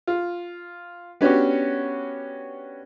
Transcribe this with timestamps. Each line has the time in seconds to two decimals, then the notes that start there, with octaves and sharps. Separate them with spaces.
0.07 F4
1.21 B3 C#4 D4 F#4 G4